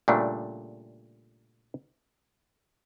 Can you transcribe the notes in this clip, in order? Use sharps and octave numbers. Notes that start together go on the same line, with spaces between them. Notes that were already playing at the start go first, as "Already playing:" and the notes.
A#2 C#3 G3 A3 D4